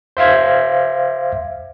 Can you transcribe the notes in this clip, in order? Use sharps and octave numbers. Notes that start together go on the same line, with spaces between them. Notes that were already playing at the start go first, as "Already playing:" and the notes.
C5 E5 F5 G#6